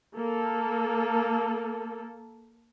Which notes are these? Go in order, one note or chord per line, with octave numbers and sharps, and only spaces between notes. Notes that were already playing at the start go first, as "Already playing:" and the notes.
A#3 A4